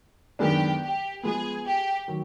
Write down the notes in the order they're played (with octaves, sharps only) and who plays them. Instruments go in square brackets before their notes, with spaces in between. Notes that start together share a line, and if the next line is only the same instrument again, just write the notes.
[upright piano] F#2 D#3 G#3 B3 D4 [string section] G4
[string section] G4
[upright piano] F3 G#3 B3 [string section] G#4
[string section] G4
[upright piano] D#3 F#3